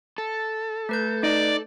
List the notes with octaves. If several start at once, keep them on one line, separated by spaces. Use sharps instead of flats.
A4
A3 B4 G6
D#4 D5